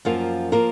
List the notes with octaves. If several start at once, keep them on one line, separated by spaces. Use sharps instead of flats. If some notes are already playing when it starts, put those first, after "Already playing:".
F#2 F3 A#3 F4 A#4
F3 A#3 F4 A#4